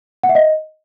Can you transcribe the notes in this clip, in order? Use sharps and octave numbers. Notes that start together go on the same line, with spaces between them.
F#5
E5
D#5